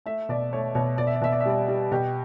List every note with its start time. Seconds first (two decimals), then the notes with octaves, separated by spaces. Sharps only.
0.06 A3 E5
0.29 B2 D5
0.53 A3 C#5
0.75 B2 C#5
0.98 B2 D5
1.07 E5
1.15 D5
1.21 B2 E5
1.32 D5
1.40 E5
1.46 G3 D5
1.68 G3
1.92 B2 G4